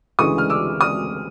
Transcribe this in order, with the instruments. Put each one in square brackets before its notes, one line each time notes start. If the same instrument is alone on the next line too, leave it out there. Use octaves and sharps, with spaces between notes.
[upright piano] D2 C#3 E3 G#3 C#6 D#6
F6
D6 E6
D#6 F6